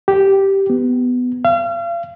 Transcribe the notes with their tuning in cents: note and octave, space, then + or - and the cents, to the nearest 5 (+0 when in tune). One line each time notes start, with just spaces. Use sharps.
G4 -5
B3 +10
F5 -35